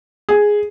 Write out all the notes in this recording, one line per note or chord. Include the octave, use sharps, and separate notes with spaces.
G#4